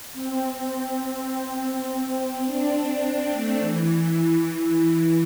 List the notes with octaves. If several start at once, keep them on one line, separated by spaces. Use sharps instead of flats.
C4
D4
C4
A3
E3